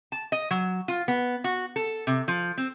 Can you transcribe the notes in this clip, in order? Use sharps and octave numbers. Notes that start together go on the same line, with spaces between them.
A5
D#5
F#3
F4
B3
F#4
A4
C3
F3
C4